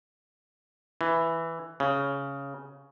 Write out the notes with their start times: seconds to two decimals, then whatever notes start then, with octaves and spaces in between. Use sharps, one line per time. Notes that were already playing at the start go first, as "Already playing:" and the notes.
1.01 E3
1.80 C#3